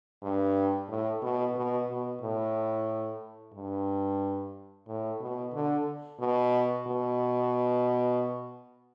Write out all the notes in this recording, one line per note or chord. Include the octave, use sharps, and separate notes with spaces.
G2
A2
B2
B2
B2
A2
G2
A2
B2
D3
B2
B2